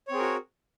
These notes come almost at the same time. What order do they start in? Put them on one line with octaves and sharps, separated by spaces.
C#5 C4 G#4 A#4 F#4